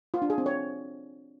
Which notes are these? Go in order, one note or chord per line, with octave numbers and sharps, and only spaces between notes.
F4
D4
G#4
C4
C#5